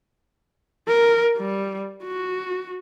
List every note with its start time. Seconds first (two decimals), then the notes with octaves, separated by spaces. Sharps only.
0.88 A#4
1.38 G3
2.04 F#4